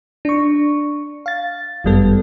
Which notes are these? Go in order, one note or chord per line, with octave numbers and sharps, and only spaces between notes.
D4 C#6
F5 A6
G1 F#2 G3 B3 A4